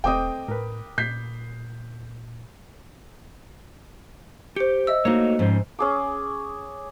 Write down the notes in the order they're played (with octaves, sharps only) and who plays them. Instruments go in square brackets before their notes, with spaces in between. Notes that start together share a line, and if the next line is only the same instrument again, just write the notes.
[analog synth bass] E1 [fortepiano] A3 C4 D#5 [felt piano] G5 D6 D#6
[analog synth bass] A2 [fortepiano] A#4 B4
[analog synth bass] A#2 [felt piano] G6 B6 C7
[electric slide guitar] G4 [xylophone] C5 C#7
[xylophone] D#5 E5 E6
[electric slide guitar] A3 F#4 C#5 [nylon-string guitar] A#3 D#4
[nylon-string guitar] G#2 [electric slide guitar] F3 C#4 C5
[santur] C#4 G#4 D6